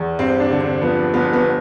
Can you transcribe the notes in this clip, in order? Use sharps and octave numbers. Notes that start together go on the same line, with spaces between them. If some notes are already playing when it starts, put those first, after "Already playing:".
Already playing: E2
G2 C4
D4
D3
C4
F3 B3
G1 B3
B3